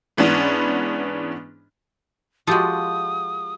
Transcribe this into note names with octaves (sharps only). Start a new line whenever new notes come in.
G#2 E3 B3 C#4 D4
F3 G#3 F#4 G4 A4 D#6